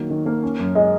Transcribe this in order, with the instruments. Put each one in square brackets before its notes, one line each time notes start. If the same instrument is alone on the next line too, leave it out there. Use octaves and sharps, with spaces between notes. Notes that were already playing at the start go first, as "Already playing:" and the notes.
Already playing: [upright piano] D#3 F#3 A#3
D#3
A#3
C#4
F#2
[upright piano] G#3 [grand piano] D#5